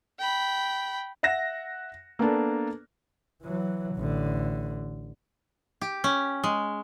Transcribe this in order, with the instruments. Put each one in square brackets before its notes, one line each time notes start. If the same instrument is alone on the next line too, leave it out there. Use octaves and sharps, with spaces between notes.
[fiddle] G5 B5
[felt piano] E5 F#5 F#6 A#6 E7
A#3 B3 D4 A4
[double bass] E3 F#3
A1 D3
[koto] G4
C#4
G#3